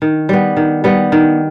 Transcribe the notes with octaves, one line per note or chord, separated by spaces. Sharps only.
D#3
G3 B3
D#3
G3 B3
D#3